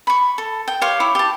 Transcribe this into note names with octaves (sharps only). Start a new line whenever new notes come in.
B5 C#6
A4
G5
G4 C#5 F5 C6
E4 C#5 D6
G4 A5